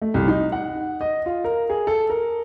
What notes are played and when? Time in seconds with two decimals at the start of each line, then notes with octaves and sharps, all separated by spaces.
0.02 A3
0.14 C2
0.28 D#4
0.52 F#5
1.01 D#5
1.26 F4
1.44 A#4
1.70 G#4
1.87 A4
2.10 A#4